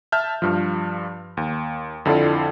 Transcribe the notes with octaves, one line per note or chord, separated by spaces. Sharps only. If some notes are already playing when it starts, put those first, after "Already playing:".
E5 A5 F6 G6
G2 F3
D#2
F2 D3 E4 F4 A4 D5